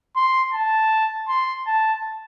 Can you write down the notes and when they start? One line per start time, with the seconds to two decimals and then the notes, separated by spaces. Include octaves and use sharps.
0.16 C6
0.53 A5
1.28 C6
1.66 A5